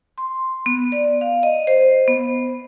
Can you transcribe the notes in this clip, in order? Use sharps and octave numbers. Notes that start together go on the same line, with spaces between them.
C6
B3
D5
F5
D#5
C5
B3